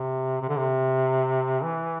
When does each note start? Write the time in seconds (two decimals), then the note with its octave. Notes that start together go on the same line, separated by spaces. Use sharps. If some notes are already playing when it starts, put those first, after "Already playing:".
Already playing: C3
0.42 C3
0.49 D3
0.57 C3
1.63 E3